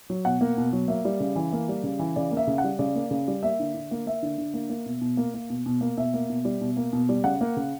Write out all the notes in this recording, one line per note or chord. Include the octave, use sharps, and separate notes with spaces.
F#3
B2 F#5
A#3
B2
F#3
A#3 E5
G3
C#3
E3
A#3
G3
C#3
E3
C#3 D5
A#3
E5
C#3
F#5
G3
C#3 D5
A#3
C#3
G3
A#3 E5
D3
D3
A#3
A#3 E5
D3
D3
A#3
A#3
B2
B2
A#3
A#3
B2
B2
A#3
B2 E5
A#3
B2
G3
B2
A#3
B2
G3
C#3 F#5
A#3
C#3